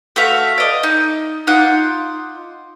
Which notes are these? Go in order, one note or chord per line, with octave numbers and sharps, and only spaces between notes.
A3 F#4 E5 F5
D5 D#5
D#4
D#4 F4 F#5 D6